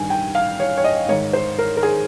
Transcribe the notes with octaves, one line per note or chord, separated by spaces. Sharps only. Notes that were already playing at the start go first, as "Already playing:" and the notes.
Already playing: G2 D#3 G#5
G5
F5
C#5
C#5
D#5
G#2 D#3 C#5
C5
A#4
A#4
G#4